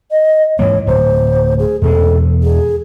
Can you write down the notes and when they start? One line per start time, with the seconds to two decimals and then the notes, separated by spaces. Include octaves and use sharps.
0.11 D#5
0.59 G#2 E3 A#3 C#5
0.87 D1 C5
1.59 G#4
1.82 E2 B2 G#3 A4
2.43 G#4